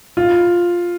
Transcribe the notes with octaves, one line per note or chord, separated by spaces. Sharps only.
F4